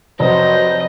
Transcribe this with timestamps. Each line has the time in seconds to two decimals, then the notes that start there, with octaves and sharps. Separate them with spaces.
0.20 F1 F#3 C5 D#5